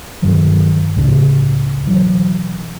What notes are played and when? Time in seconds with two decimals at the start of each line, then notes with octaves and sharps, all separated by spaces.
0.22 G2 D#3 F3 F#3
0.96 C#2 A2 C#3 D4
1.86 B2 E3 F#3